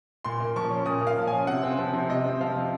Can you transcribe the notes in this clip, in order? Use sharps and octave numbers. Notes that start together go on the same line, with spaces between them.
A#2 C6
A#3
F3 C#6
C#4
A#2 D#6
A#3
F5
F3
C#4 G#5
C3 F#5
C4
F3
C3
C3 D#5
C4
F3 F5
C3